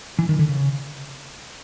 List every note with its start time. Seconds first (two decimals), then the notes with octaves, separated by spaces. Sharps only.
0.19 E3
0.29 D#3
0.39 D3
0.49 C#3